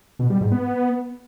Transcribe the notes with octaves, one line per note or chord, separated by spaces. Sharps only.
B2
G3
G#2
B3